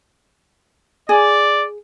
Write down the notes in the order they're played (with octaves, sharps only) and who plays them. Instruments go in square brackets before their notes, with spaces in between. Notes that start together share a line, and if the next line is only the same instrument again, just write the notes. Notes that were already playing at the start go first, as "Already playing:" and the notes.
[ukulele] G#4 [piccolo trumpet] D5